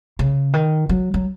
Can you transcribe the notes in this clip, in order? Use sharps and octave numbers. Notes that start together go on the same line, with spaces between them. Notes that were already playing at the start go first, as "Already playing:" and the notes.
C#3
D#3
F#3
F#3